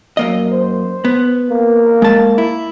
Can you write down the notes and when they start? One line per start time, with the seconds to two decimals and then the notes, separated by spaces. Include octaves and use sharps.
0.17 F#2 A#3 D#5
0.52 C5
1.05 B3
1.50 A#3
2.02 G#3 A5
2.38 E4